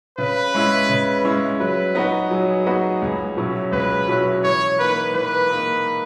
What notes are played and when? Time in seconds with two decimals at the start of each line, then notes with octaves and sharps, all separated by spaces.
0.18 C#3 B4
0.54 G#3 C#4 E4
0.89 C#3
1.24 G#3 C#4 E4
1.60 F#3 B4
1.95 B3 D#4 F#4
2.31 F#3 G#4
2.66 B3 D#4 F#4
3.02 C#2
3.37 B2 F#3 C#4 E4
3.72 C#2 B4
4.08 B2 F#3 C#4 E4
4.44 E3 C#5
4.79 A#3 D#4 B4
5.14 E3 B4
5.50 A#3 D#4